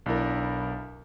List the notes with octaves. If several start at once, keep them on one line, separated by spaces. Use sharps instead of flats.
B1 D4 E4 A#4